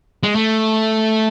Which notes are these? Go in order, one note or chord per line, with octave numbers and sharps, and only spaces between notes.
G#3
A3